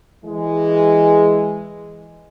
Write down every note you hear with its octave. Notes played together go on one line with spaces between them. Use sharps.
E3 G#3